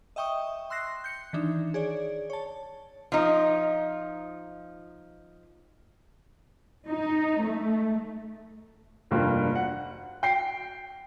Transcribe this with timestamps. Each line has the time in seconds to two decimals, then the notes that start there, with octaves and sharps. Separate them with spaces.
0.16 D#5 E5 G5 C#6 D#6
0.70 C6 E6 F#6 A#6 C7
1.04 G6 C#7
1.33 D#3 E3 D4 D#4
1.74 G#4 C#5 D5
2.30 C#5 A5
3.12 F3 D#4
6.87 D#4
7.43 A3
9.11 F1 G2 A#3 F4
9.55 F#5
10.23 G5 C7